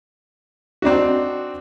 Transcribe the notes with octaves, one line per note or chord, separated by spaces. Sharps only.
C4 D4 D#4 F#4